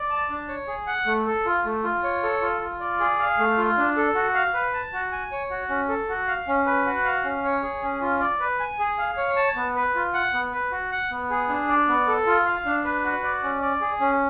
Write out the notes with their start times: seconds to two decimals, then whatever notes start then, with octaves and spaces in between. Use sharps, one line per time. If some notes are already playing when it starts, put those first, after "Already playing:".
Already playing: D5
0.10 A5
0.30 D4
0.48 C#5
0.67 G#4
0.87 F#5
1.06 A3
1.27 A4
1.46 F4
1.65 A3
1.84 F4
2.04 C#5
2.23 A4
2.41 F4
2.61 F4
2.80 D5
3.00 G#4
3.19 F5
3.39 A3
3.57 F4
3.78 D4
3.97 A4
4.15 F#4
4.35 F5
4.54 B4
4.74 A5
4.93 F#4
5.12 G#5
5.32 C#5
5.50 F#4
5.69 C#4
5.89 A4
6.09 F#4
6.27 F5
6.48 C#4
6.66 B4
6.86 F#4
7.05 F5
7.24 C#4
7.44 C#5
7.63 G#4
7.83 C#4
8.01 F4
8.20 D5
8.40 B4
8.60 G#5
8.79 G#4
8.98 F5
9.17 C#5
9.36 A5
9.56 B3
9.76 B4
9.95 F4
10.14 F#5
10.34 B3
10.53 B4
10.72 F#4
10.92 F#5
11.11 B3
11.30 G#4
11.49 D4
11.69 D5
11.88 B3
12.07 A4
12.26 F4
12.46 F5
12.66 D4
12.85 B4
13.04 F#4
13.24 D5
13.43 C#4
13.62 D5
13.81 G#4
14.00 C#4